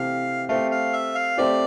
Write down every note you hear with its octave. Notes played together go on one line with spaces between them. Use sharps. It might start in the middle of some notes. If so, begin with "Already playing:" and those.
Already playing: C3 E3 A3 C4 G4 F5
A3 C4 G4 F5
F5
E5
F5
A3 C4 G4 D5